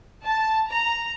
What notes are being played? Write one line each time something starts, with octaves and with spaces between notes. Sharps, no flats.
A5
A#5